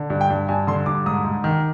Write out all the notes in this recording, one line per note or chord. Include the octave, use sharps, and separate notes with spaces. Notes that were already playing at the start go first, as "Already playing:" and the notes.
Already playing: D3
G2
G5
G2
G2 G#5
D3 C6
G2 D6
G#2 D#6
G#2
D#3